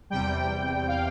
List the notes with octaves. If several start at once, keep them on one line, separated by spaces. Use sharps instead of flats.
E2 C3 G3 G5
F5